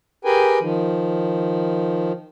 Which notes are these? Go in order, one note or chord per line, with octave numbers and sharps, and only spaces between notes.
G4 G#4 A#4 B4 G5 G#5
D#3 F3